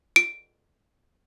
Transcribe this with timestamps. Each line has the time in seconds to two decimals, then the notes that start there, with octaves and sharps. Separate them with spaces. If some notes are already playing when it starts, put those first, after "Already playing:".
0.16 D7